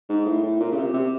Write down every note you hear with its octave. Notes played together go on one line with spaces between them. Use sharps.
G#2
A2
A2
A#2
C#3
C3
C3